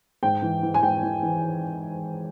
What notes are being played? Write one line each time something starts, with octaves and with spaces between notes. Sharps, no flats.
G#2 G5
E3
E3
G#5
G#2 G5
E3
E3